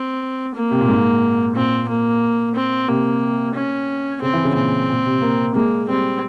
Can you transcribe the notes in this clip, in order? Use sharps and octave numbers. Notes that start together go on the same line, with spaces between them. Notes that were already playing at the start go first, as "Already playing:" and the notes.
Already playing: C4
A#3
C3
A#2
G#2
A#2 C4
A#3
C4
C3 A#3
C#4
C#3 C4
E3
C#3
A#2 C4
A#2
C3
A#3
G#3 A#3
G3 C4